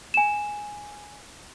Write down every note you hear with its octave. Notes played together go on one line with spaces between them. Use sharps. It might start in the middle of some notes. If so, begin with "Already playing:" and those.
G#5 E7